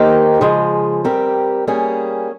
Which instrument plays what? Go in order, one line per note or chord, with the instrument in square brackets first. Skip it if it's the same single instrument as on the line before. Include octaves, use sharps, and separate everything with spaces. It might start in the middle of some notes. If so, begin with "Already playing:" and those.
Already playing: [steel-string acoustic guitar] D#3 A#3 D#4 G4 C5
C#3 F3 G#3
G3 C4 G4 A#4
G3 A#3 C#4 G#4